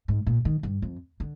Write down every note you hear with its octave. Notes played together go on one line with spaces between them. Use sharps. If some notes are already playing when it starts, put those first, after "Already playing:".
G#2
A#2
D#3
G2
F2
D3